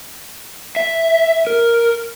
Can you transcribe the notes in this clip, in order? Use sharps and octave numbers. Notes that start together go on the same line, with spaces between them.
E5
A#4